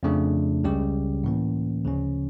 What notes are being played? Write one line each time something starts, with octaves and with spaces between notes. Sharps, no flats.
F2 C#3 F3 A3 D4
C#2 C#3 G3 C#4 G4
A2 E3 A#3 C#4
D2 C#3 F3 C#4